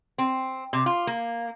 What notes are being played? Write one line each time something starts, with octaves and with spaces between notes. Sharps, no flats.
C4
C3
F4
A#3